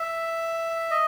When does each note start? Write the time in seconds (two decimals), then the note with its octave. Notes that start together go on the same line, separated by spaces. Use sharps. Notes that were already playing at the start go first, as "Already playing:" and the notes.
Already playing: E5
0.91 D#5